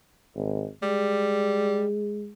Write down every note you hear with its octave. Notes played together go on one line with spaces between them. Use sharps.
G#1
G3 G#3